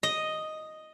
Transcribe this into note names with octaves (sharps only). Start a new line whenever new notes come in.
D#5